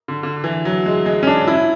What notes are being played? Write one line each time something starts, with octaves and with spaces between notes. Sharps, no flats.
D3
D3
E3
F#3
G#3
G#3
C#4
D4
E4